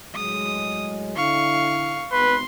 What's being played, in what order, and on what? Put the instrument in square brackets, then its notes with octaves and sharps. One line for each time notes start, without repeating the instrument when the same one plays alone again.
[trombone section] A2 F#3 G#3 [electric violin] D#6
[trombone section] D3 E4 [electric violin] F5 C#6
[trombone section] G#1 B3 [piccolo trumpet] B4 [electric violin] C6